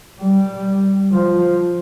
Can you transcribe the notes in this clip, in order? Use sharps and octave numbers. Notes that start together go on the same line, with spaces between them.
G3
F3